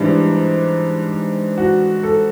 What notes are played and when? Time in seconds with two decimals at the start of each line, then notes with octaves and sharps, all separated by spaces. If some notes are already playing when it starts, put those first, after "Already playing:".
Already playing: G#2 E3 G3 D4
1.58 F#4
2.03 A4